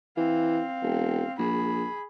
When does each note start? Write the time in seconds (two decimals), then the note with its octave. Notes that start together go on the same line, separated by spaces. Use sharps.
0.17 E3 C4 F5
0.82 E1
1.39 A#1 G#4 B5